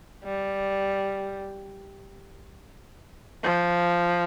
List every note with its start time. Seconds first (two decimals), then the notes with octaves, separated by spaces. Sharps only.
0.25 G3
3.44 F3